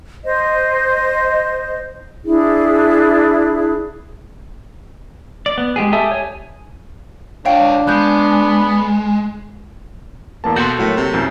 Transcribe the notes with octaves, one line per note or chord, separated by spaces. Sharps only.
C5 D#5
D4 E4 G#4
D5
B3
G#3 G4 G#4
G4 A4 E5 G#5 D#6
C#5 G#5
D4 F4 C#5 F5 G5 C7
G#3 B3 F#6 G6
E2 A#3 B4 A5
B2 F#4 A4 F#5 C6 G6
A2 F#3 A#3
C3
C2 F#2 C4